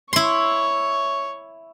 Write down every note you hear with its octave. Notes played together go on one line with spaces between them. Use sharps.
E4 C#5 C6 C#6